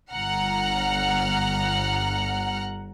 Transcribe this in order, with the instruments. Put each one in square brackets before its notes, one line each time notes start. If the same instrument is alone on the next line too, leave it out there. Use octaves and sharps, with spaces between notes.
[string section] G1 F#5 A#5 F6